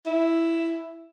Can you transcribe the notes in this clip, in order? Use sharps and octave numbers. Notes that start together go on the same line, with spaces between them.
E4